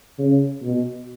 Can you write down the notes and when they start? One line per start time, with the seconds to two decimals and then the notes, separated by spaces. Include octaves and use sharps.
0.18 C#3
0.63 B2